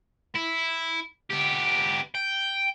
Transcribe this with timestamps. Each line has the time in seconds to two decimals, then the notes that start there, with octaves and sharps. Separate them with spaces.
0.35 E4
1.30 B3 G4
2.15 G5